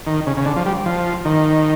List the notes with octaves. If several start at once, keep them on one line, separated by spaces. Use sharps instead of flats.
D#3
C#3
C#3
D3
F3
G3
F3
D#3